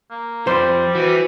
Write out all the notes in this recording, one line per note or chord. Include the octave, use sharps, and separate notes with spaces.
A#3
F2 G3 C5
E3 F#4 B4